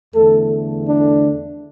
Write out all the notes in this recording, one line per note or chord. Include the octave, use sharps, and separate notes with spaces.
E2 D3 A3 A4
D4